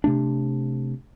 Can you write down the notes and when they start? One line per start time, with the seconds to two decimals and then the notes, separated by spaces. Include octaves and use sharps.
0.04 C3 A3 D4